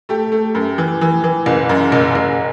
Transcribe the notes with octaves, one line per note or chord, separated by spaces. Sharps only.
A3 G4
A3
F#2
E3
E3
E3
F#1
F#2
F#1
F#1